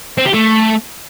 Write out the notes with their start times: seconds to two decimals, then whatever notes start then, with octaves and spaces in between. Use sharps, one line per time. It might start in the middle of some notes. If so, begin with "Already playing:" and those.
0.18 C4
0.26 G4
0.34 A3